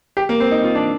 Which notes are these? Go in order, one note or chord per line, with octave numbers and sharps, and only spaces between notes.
G4
A#3
C4
D#4
F4
D4